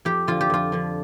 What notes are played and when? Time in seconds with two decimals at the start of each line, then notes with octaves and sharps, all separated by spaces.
0.05 F2 G4
0.27 D3 F3 F4
0.41 G4
0.50 F2 F4
0.72 D3 F3